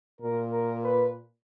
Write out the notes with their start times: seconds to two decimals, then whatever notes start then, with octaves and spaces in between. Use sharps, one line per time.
0.21 A#2 A#4
0.52 A#4
0.83 B4